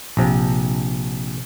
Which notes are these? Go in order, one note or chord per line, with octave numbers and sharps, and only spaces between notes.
A#1 C3